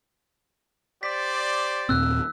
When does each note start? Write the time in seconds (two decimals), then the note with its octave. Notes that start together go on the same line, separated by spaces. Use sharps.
1.03 G4 C5 D5 B6
1.89 D#2 A#2 C4 E6 F#6